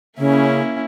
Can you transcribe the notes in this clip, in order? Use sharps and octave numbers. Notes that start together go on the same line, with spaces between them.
C#3 A#3 C#4 E4